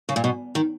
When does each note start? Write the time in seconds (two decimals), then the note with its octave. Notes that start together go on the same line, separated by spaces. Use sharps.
0.09 C#3
0.16 A#2
0.24 B2
0.55 D#3